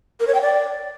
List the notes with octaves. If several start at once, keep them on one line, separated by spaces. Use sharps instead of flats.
A#4
C#5
G5
D5